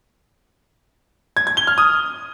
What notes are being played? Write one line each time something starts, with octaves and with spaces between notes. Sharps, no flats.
G#6
G#6
G7
F6
D#6